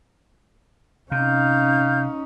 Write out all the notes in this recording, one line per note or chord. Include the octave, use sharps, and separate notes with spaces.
C3 C#4 D#4 F5 G6